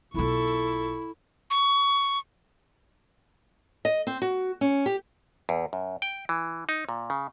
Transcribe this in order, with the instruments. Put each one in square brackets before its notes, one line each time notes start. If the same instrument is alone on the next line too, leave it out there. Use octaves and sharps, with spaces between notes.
[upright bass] B1 F4 [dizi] E4 [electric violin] A4 C#6
[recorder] C#6
[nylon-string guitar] D#5
C4
F#4
C#4
G4
[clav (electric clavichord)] E2
F#2
G5
E3
D#4
A#2
C#3